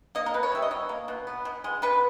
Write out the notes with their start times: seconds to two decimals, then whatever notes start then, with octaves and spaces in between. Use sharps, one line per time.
0.15 A#3 D#5
0.26 A#4
0.34 B2 B4
0.43 C#5
0.52 G3 E5
0.62 D#5
0.71 B2 C#5
0.89 A#3
1.08 B2
1.27 B3
1.45 B2
1.64 G#3
1.82 B2 B4